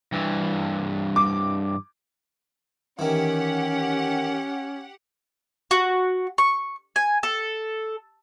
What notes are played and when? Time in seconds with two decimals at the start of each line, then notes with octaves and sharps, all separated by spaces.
0.12 G2 E3
1.16 D6
2.99 D#3 E3 C#4 G4 F#5
5.71 F#4
6.38 C#6
6.96 G#5
7.23 A4